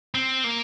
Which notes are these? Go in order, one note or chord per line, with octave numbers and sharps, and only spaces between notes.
C4
A#3